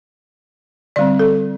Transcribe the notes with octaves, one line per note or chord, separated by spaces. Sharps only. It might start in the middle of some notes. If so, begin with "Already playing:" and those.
D3 G3 C4 D5
A4